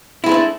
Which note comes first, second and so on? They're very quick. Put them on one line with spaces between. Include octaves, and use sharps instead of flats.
E4 G#3 D4 C4 A3